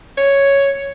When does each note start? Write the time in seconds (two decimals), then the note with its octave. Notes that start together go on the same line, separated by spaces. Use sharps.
0.17 C#5